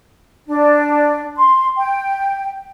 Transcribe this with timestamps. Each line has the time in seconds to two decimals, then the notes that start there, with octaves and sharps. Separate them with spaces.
0.48 D4
1.36 C6
1.77 G5